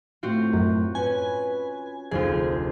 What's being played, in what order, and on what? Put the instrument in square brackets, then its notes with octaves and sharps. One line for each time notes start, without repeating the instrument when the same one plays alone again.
[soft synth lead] A2 [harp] C4 F4 F#4
[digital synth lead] F#2
[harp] C#4 [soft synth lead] B4 [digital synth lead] G#5
[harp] F1 D2 F4 [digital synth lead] G#4 [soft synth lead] C5